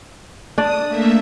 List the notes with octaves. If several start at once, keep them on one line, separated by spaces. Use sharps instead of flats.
D4 D5 D#6
A3 A#3 E5